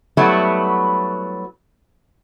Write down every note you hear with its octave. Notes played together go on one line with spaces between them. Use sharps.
F#3 G3 A3 B3 E4 F#4